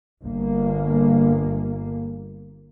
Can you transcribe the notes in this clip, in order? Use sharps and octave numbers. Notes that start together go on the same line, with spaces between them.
G1 A#3